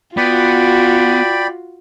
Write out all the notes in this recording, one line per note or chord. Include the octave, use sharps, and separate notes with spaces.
B3 F4 F#4 D5 G5 B5